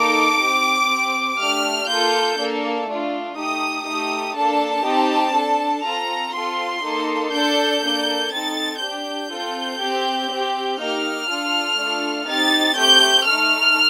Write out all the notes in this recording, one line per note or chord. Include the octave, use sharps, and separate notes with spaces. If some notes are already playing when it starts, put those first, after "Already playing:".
Already playing: A#3 D#4 A4 D6
C4 G4
C4 G4
A3 D4 G4 F6
A#3 F4 A4 G6
A#3 D4 A4
A3 D4 F4
A3 D#4 G4 D#6
A3 D#4 G4 D#6
A#3 D4 A4 A5
C4 D#4 G4
D4 A4
C4 F4 A4 A#5
C4 F4 A4 C6
A#3 D#4 A4
D4 A4 G6
A#3 D4 A4
C4 D#4 A4 A6
D4 G4 G6
C4 F4 A4
C4 G4
C4 G4
A#3 D#4 G4 F6
D4 F4 A4
A3 D4 F4 A4
C4 D#4 G4 A6
A3 C4 G4 G6
A3 D#4 A4 F6